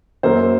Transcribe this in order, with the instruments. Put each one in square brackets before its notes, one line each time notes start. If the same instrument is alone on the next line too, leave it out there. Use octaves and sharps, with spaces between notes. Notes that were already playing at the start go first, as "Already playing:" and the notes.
[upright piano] F#2 F#3 A#3 C5